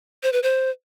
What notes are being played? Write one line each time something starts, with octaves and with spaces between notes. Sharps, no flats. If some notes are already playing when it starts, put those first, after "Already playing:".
C5
B4
C5